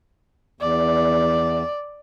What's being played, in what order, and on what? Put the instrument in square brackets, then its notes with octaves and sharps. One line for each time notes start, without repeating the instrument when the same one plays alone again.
[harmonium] E2 [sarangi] D5